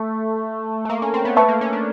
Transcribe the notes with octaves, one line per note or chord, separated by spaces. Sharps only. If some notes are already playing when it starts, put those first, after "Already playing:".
Already playing: A3
A3
A#3
C#4
C4
B3
A3 B4 E5 A5 C#6
A#3
C#4
D4